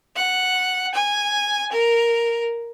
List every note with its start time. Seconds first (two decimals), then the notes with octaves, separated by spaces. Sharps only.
0.16 F#5
0.94 G#5
1.72 A#4